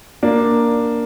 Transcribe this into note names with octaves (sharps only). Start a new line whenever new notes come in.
A#3 D4